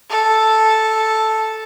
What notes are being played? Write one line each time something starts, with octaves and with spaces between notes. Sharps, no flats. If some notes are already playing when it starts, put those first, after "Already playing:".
A4